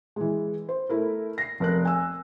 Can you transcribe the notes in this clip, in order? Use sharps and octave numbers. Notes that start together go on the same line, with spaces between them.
E3 G#3
C5
A3 E4 A#4
A#6 C7
F1 A#4 F#6
G#5 E6